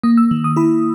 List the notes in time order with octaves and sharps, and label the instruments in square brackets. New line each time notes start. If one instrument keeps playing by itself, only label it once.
[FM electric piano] A#3 D#6
E6
D#3
D#6
E4 B5